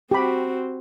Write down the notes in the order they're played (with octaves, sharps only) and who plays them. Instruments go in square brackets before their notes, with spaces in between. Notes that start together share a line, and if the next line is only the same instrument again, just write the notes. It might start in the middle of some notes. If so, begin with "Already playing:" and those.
[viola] C4 F#4 [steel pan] G4 B5